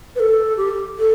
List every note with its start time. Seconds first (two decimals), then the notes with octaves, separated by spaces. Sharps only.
0.16 B4
0.20 A4
0.57 G4
0.99 A4